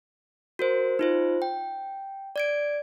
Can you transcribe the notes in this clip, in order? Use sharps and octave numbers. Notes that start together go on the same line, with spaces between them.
F#4 A#4 C5
D#4 F4 C5
G5
D5 G#6 D7